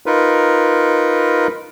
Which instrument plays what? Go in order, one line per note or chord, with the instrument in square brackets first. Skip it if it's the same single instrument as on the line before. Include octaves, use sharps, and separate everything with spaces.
[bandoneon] D#4 F4 A#4 B4